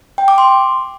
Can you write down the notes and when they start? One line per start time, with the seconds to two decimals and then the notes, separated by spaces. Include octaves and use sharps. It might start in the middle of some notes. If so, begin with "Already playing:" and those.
0.18 G5
0.28 D6
0.38 C6